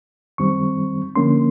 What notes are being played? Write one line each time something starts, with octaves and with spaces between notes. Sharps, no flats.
F#2 D#3 G3 C4 C#6
D3 F3 A#3 C#4 C6